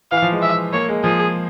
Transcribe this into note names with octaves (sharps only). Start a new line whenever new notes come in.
E3 F5
F3
G#3
E5
A#3 C#5
G#3
F3 G#4